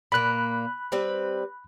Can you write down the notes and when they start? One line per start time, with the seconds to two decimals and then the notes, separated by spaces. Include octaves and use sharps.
0.12 A#2 A#3 B5 F#6
0.92 G3 C4 B4